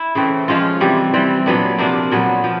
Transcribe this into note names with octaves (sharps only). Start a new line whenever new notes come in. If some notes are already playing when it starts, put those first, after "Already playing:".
Already playing: E4
C#3 E3 A3 C4
F3 G#3 C#4 F4
C3 E3 G3
E3 G3 C4
A#2 F#3 B3 D4
C3 F3 A#3 D4
A#2 F#3 B3
F3